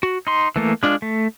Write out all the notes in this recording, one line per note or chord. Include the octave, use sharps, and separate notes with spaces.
F#4
D#4 C6
E3 A3 A#3
G#3 D4 F4
A3